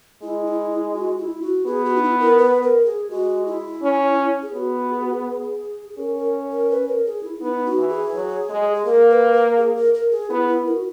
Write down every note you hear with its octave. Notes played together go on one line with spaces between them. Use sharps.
G#3 E4
E4
E4
F#4
F#4
E4
F#4
B3 G#4
F#4
D#4
E4
A#4
B4
A#4
G#4
G#3 F#4
E4
C#4
G#4
B3 F#4
G#4
F#4
G#4
G#4
C#4 A#4
A#4
A#4
B4
A#4
G#4
E4
B3 D#4
F#4
E3
G#4
F#3
G#3
G#4
A#3 A#4
B4
A#4
G#4
A#4
A#4
G#4
B3 E4
E4
A#4
F#4